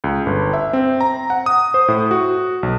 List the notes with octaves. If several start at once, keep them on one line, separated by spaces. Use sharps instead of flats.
C#2
G1
E5
C4
A#5
F#5
D#6
C5
A2
F#4
B1